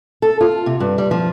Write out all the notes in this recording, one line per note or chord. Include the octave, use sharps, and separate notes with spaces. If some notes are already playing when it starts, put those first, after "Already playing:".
A4
F4
C3
G2
G3
F3